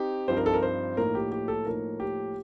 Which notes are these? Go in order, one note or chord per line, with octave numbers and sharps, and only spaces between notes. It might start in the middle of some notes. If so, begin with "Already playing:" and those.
Already playing: C4 D#4 G4
G2 F3 C4 D#4 C5
A#4
A4
A#4
C5
A2 F3 A#3 D#4 A#4
G4
G4
A4
A2 F3 A#3 D#4 A#4
G4